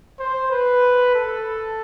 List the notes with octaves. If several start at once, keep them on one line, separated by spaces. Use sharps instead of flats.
C5
B4
A4